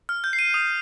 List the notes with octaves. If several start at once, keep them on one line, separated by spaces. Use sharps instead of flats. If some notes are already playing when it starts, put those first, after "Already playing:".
F6
G6
C7
D#7
D#6